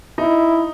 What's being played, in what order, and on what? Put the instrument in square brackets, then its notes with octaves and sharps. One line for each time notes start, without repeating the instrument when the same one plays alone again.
[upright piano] D#4 [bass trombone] E4